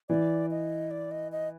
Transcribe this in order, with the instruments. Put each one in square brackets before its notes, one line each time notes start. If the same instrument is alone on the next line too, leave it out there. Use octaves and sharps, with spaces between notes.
[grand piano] E3 [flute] D5
[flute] D#5
D5
D#5
D#5